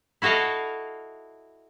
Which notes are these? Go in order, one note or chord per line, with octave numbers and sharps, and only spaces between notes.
E4 F#4 A4 D#5 F5